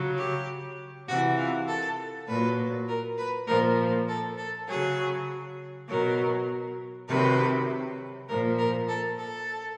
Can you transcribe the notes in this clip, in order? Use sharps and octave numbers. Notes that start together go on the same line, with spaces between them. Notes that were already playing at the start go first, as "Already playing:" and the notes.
Already playing: C#3 F#3
G4
C3 E3 F#4
F4
A4
A#2 F#3 B4
A#4
B4
A#2 F3 A#4
A4
A4
C#3 F#3 G#4
B2 F#3 A#4
C3 D#3 F#3 B4
A#2 F3 A#4
A#4
A4
A4